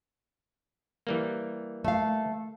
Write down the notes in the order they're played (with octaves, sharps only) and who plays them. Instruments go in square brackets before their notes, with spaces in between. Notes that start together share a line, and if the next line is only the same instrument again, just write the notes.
[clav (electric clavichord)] E3 G3 A#3
[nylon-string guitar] A3 F5